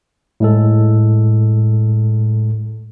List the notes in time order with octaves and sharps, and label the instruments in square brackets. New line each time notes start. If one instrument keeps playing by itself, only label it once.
[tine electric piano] A2 G#3 A4